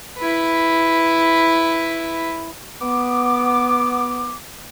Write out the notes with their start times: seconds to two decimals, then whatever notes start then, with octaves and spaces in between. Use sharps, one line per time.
0.18 E4 B4
2.81 B3 D6